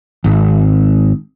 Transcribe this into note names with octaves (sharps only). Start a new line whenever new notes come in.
G#1